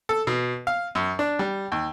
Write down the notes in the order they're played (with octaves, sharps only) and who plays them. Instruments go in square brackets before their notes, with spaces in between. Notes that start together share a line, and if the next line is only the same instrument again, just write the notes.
[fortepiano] A4
B2
F5
F#2
D4
G3
D#2